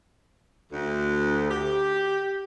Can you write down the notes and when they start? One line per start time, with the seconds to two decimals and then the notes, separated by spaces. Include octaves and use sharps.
0.72 D2
1.51 G4